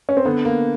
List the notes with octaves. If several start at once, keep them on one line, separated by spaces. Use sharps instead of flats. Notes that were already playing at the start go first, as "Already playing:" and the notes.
C#4
C4
D3 B3
A#3